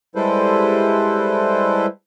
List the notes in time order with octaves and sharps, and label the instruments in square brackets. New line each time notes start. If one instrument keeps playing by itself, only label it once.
[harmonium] G3 G#3 E4 A4 B4 C5